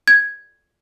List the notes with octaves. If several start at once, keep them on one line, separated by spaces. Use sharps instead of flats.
G#6